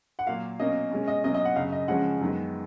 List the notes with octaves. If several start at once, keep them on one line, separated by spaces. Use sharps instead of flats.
F#5
A#2 F#3 A#3 F5
B2 F#3 A#3 C#4 D#5
B2 G#3 C#4
D#5
B2 F#3 A#3 C#4 D#5
D#5
F#5
F#2 C#3 F#3 F5
D#5
C#3 F3 G#3 C#4 F#5
F#2 D#3 G#3 B3